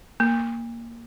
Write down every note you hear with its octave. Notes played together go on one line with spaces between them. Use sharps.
A#3